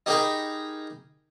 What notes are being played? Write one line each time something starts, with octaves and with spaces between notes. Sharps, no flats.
D#4 G4 G#4 A#4 G5 B5